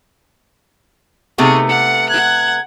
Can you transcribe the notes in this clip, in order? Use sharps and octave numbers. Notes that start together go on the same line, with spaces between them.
C3 A3 B3 D#4 G#4 C#6
F#5 C#7
F#5 F#6 G#6